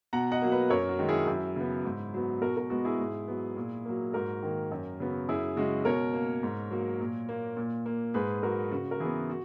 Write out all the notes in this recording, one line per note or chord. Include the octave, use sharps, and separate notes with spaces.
B2 F#5 A#5
D#5 F#5
F#3 A#3
B4 D#5
F#2 A#4 C#5
F#4
D#3 G#3
E4 G#4
F#2 E4
C#3 F#3 B3
G#2
F#3 B3
B2 F#4 A#4
F#4 A#4
G#3 B3 F#4
E4 G#4
G#2
F#3 B3
A#2
F#3 A#3
G#2 F#4 A#4
D#3 A#3
F#2
C#3 F#3 B3
F#2 E4 G#4
C#3 G#3 F#4
B2 A#4 C#5
A#3
G#2
F#3 A#3
A#2
A#3
A#2
A#3
G#2 G#4 B4
F#3 A#3 F#4 A#4
C#3 F#4
A#4
E3 B3 E4 G#4
F#4